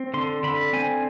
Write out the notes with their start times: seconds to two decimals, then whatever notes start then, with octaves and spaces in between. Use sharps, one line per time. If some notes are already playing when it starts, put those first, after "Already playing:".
Already playing: C4
0.14 D3 C6
0.43 D3 B5
0.73 C4 G#5